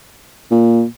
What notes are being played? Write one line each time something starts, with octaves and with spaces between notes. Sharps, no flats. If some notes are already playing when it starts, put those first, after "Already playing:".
A#2